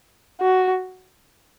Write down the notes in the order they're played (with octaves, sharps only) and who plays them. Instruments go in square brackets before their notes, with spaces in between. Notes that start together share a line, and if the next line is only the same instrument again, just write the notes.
[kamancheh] F#4